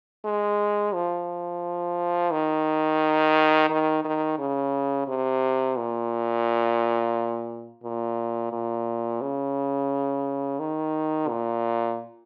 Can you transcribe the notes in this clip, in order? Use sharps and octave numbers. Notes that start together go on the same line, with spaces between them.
G#3
F3
D#3
D#3
D#3
C#3
C3
A#2
A#2
A#2
C#3
D#3
A#2